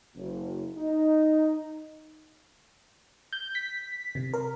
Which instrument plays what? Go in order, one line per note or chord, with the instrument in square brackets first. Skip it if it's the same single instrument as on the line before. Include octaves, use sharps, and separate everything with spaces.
[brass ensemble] F#1
D#4
[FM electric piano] G6
B6
C3
A#4